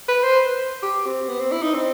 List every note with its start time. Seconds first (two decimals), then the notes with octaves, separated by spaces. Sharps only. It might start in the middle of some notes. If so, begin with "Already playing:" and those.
0.08 B4
0.23 C5
0.83 G4
1.06 C4
1.29 B3
1.40 C4
1.52 E4
1.62 D#4
1.74 C4